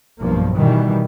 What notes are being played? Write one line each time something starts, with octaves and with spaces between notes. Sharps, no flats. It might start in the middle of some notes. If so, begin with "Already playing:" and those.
B1 G2 F3 A#3
B2 D#3 E3 G3